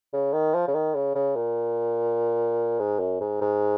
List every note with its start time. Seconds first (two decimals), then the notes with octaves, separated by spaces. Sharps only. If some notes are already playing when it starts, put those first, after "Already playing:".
0.13 C#3
0.33 D#3
0.54 F3
0.68 C#3
0.74 D#3
0.95 C#3
1.15 C#3
1.36 A#2
2.79 G#2
3.00 F#2
3.20 G#2
3.41 G#2